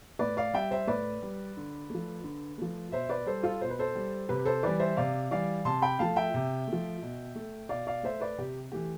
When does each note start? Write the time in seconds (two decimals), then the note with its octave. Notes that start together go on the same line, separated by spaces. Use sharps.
0.19 A2 B4 D5
0.37 D5 F5
0.53 G3 E5 G5
0.71 C5 E5
0.88 A2 B4 D5
1.23 G3
1.57 D3
1.90 F3 A3
2.24 D3
2.58 F3 A3
2.92 B2 C5 E5
3.09 B4 D5
3.26 G3 A4 C5
3.43 F4 A4
3.61 B2 C5
3.70 B4
3.79 A4 C5
3.96 G3
4.29 C3 G4 B4
4.45 A4 C5
4.63 E3 G3 B4 D5
4.80 C5 E5
4.97 C3 D5 F5
5.31 E3 G3 D5 F5
5.65 C3 A5 C6
5.82 G5 B5
5.99 F3 A3 F5 A5
6.16 E5 G5
6.34 C3
6.68 F3 A3
7.02 B2
7.35 A3
7.69 B2 D5 F5
7.87 D5 F5
8.03 A3 C5 E5
8.20 B4 D5
8.38 C3 G4
8.72 E3 A3 G4